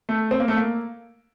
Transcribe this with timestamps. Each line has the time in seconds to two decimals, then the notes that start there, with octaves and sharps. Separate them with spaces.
0.09 A3
0.31 C4
0.40 A#3
0.48 A3
0.57 A#3